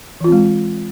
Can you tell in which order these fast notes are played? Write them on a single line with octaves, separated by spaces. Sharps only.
E3 F4 C4 G#3